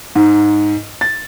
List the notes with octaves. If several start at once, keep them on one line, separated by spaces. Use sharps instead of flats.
G#2
A6